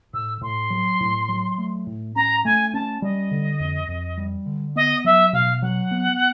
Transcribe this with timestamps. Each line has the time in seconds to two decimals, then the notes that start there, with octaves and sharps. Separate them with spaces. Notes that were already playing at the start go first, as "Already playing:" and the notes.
0.13 A2 E6
0.41 A2 C6
0.70 F#3
1.00 A2
1.28 F#3
1.58 A3
1.87 A2
2.15 C#4 A#5
2.44 A3 G#5
2.73 C#4 A5
3.02 G3 D#5
3.31 D3
3.60 F2
3.88 F2
4.17 G3
4.46 D3
4.76 B3 D#5
5.04 F#3 E5
5.33 B2 F5
5.62 F#3 F#5
5.91 B3